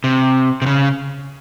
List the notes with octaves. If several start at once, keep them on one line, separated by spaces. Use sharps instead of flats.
C3
C3
C#3